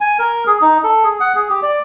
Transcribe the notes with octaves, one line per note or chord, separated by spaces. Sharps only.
G#5
A#4
G#4
D#4
A4
G#4
F#5
G#4
G4
D5